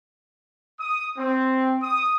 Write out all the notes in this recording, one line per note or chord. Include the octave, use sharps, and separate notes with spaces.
D#6
C4
D#6